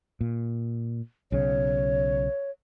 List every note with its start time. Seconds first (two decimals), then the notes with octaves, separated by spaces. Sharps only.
0.21 A#2
1.32 B1 C#3 C#5